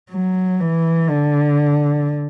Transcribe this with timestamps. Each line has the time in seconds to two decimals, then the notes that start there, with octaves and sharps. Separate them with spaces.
0.11 F#3
0.60 E3
1.10 D3